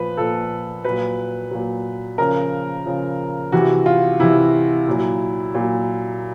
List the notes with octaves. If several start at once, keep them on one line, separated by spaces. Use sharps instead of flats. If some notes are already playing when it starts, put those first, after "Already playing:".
Already playing: A#2 F3 B4
A#2 F3 A4
A#2 F#3 B4
A#2 F#3
C#3 F3 A#4
C#3 F3
C3 E3 F#4
F4
C3 E3 E4
A#2 F#3
A#2 F#3